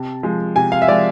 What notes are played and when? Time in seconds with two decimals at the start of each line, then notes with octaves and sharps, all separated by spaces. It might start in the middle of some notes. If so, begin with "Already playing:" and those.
Already playing: C3 A5
0.23 F3 G#3
0.56 C3 G#5
0.72 F5
0.82 E5
0.88 F3 G#3 D5